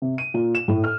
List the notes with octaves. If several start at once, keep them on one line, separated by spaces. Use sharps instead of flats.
C3
D#7
A#2
E7
A2
F6